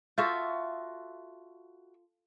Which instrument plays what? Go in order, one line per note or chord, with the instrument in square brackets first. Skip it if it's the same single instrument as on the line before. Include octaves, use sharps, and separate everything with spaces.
[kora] F4 A4 [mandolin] F#4 E5 G6